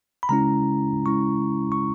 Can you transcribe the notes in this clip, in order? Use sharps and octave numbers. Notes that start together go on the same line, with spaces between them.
B5
C#3 G#3 C#4 E4 A#5
C#3 G#3 C#4 E4 C#6
C#6